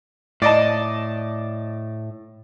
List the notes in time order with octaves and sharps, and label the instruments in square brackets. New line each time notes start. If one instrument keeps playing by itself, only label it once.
[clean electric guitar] A2 [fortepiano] D5 D#5 A5